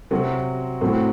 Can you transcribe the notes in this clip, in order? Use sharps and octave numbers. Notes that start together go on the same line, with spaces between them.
C3 F#3 C4 F#4
A2 F#3 C4